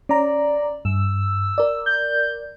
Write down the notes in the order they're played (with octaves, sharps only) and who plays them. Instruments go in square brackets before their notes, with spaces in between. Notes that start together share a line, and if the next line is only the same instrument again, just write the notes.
[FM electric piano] C#4 A#5 [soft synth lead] D5
[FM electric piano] G2 [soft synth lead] E6
[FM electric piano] A#4 D5
[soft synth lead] G6